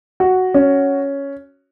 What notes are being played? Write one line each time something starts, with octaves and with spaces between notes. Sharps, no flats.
F#4
C#4